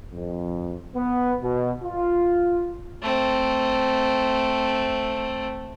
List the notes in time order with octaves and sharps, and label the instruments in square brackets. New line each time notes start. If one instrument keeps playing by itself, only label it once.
[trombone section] F2
B3
B2
F4
[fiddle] A3 C4